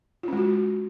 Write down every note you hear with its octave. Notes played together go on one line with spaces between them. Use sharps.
G#3 C#4 F4 F#4